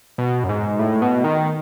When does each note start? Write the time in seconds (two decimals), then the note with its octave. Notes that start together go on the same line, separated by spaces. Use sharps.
0.18 B2
0.44 F#2
0.49 G#2
0.79 A2
1.02 B2
1.24 D#3